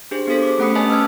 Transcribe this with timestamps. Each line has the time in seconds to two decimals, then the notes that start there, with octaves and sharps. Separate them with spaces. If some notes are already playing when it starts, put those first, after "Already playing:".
0.11 D4 G4 G#4 C5
0.27 B3 G4 A4 C5 B6
0.42 D6
0.59 A3 C#4 F#5 B5 D#6 C#7
0.75 C#4 B4 C#5 D#5 G#5 A5
0.90 E6 F6 G#6